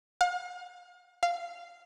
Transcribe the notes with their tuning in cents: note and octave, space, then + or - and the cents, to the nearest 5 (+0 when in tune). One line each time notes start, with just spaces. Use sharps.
F5 +40
F5 -10